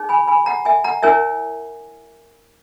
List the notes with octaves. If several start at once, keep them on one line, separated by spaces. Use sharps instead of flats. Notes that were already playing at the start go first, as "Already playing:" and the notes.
Already playing: D#4 G#4 C#5
G#5 B5
G#5 B5
F#5 A#5
E5 G#5
F#5 A#5
E4 A#4 C#5 E5 G#5